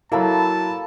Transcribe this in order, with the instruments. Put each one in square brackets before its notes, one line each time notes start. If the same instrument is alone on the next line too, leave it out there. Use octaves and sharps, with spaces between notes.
[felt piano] F#3 E4 [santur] A#3 A4 B5 [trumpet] A5